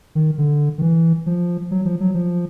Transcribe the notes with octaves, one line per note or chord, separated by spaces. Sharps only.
D#3
D3
D#3
E3
F3
F#3
F3
F#3
F3